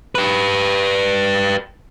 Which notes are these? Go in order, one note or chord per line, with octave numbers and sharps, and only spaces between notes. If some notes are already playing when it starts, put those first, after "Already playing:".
G4 B4